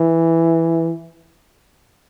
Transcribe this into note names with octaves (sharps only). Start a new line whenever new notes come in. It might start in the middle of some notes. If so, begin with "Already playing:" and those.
Already playing: E3